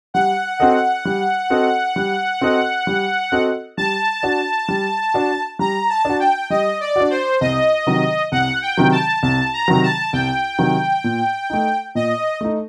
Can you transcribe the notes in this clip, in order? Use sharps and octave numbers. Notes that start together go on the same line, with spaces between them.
G3 F#5
C4 F#4 A4 D#5
G3
C4 F#4 A4 D#5
G3
C4 F#4 A4 D#5
G3
C4 F#4 A4 D#5
G3 A5
D4 F#4
G3
D4 F#4
G3 A#5
A5
D4 F#4
G5
G3 D#5
D5
D4 F#4
C5
C2 D#5
C3 D#3 F#3
C2 F#5
G5
C3 D#3 F#3
A5
C2 A5
A#5
C3 D#3 F#3
A5
C2 G5
C3 D#3 F#3
A#2
A3 D#4
A#2 D#5
A3 D#4